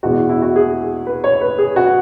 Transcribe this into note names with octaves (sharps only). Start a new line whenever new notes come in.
E2 B2 G#3 F#4
E4
E4
F#4
G#4
B4
C#5
B4
G#4
F#4